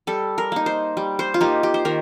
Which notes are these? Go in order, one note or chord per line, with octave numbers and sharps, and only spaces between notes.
G3 A4
A#4
A#3 D#4
C5
G3
C5
F4
A#3 D#4 G4
G4
C5
D#3 A#4